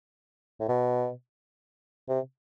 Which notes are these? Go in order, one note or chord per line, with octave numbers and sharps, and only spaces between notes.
A2
B2
C3